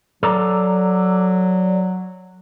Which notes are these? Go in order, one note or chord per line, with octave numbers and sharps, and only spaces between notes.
F#3 A4 D5 A#5